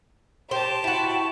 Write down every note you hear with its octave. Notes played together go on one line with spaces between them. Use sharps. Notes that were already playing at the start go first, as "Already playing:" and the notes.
G4 C5 A5
E4 F#4